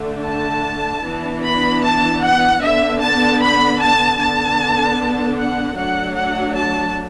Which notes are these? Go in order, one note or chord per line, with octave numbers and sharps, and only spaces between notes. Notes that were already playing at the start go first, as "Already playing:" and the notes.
Already playing: D3 A3 D4
A5
E3 B3 D4
B5
A5
F#5
D3 B3 D4 E5
A5
B5
A5
D3 B3 D4 A5
F#5
F#3 A3 D4 F#5
F#5
A5